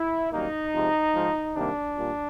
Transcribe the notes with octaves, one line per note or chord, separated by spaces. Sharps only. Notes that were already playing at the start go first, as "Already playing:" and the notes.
Already playing: E4
F#2 D#3 G3 A#3 D#4
C3 F3 G#3
G#2 F3 G#3
C3 D#3 G3 A#3 D4
A#2 G3